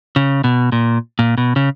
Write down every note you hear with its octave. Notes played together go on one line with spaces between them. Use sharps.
C#3
B2
A#2
A#2
B2
C#3